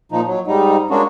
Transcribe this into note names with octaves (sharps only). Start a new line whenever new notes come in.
A#2 F3 D#4
F#3
G#2 G3 D#4
G#3 A#3 C#4 D4 F#4